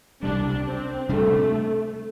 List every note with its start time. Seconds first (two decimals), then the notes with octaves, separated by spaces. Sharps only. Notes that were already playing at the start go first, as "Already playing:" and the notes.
0.23 C2 C3 G3 D4
0.66 C4
1.09 C3 G3 A3 D4